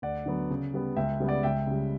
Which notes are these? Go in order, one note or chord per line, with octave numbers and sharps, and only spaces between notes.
D2 D5 F#5
D3 F#3 B3
C#3
G3 B3
C#2 E5 G5
C#3 G3 B3
D5 F#5
C#2 E5 G5
C#3 G3